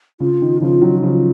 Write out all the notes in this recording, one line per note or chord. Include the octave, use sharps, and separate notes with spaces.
C#3 F4
D#3
C#3 F3 F4
D#3 F#3
C#3 F3 F4